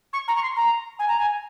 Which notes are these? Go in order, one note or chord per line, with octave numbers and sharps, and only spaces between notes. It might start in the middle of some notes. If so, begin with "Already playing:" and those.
C#6
A#5
C#6
C6
A#5
G#5
A#5
G#5